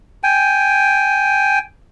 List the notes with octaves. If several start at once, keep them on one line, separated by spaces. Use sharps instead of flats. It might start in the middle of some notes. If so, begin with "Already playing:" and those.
G5 G#5